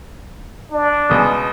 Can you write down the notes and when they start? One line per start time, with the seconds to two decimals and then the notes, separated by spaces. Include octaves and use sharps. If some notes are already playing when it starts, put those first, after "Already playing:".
0.71 D4
1.09 C#2 B2